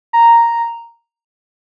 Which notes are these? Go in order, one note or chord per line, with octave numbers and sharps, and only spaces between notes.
A#5